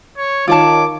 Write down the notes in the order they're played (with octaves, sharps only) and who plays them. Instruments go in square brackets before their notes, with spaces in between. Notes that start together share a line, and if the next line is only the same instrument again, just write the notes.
[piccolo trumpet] C#5
[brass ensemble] D#3 [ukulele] F4 C#5 A5 [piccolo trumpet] D6